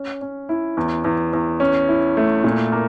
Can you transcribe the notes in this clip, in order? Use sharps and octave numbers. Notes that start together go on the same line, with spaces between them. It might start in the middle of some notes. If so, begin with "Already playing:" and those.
Already playing: C#4
C#4
E4
E2
E2
E2
C#4
E4
A3
A#2
A#3